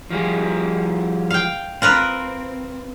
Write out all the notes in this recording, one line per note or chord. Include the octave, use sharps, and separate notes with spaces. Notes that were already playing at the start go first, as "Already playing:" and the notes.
F3 G3 G#4
F5 G5
C4 F4 A#4 B4